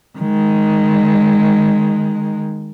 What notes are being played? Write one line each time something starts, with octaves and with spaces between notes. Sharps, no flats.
D#3 G#3